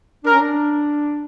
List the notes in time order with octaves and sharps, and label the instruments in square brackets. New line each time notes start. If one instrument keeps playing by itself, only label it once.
[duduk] D4 [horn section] A#4
[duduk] C#4
D4